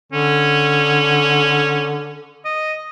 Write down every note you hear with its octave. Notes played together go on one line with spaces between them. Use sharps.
D3 C#4
D#5